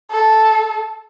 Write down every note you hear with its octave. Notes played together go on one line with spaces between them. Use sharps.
A4